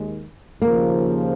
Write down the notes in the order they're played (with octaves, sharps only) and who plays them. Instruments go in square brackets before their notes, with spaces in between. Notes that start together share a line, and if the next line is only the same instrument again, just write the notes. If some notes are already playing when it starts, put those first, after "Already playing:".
Already playing: [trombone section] D#2 D#3 G#3
[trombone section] D#2 C#3 F3 [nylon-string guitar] A#3